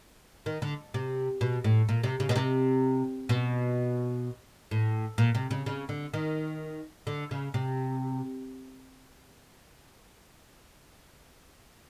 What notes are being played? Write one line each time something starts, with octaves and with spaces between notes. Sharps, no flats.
D#3
D3
C3
B2
A2
A#2
C3
C#3
B2
C3
B2
A2
A#2
C3
C#3
C#3
D3
D#3
D3
C#3
C3